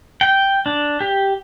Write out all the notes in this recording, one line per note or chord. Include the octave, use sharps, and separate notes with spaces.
G5
D4
G4